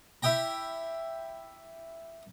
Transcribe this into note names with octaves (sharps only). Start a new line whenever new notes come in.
E4 G4 G5 A#5